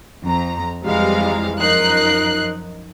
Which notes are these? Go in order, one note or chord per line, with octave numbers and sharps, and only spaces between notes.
F2 A#5
F2 E3 G3 G#3 F5 A#5
F#2 F3 D#4 A#4 F#6 C7